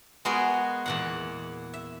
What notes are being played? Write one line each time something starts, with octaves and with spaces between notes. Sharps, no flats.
G#3 B3 F#4 G#4 A#4
E2 A#2 F#5
E5